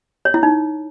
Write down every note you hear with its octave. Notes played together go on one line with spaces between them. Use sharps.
C#5
E4
D#4